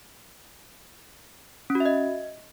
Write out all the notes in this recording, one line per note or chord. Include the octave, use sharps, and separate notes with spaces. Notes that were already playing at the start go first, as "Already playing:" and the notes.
C#4
F#4
E5
D#5